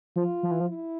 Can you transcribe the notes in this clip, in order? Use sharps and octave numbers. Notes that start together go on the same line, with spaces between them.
F3 F4
F3
E3
F3
E4